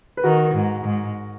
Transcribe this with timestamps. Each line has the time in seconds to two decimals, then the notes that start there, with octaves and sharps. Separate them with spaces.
0.17 B4
0.24 D#3 F#4 A#4
0.54 G#2
0.85 G#2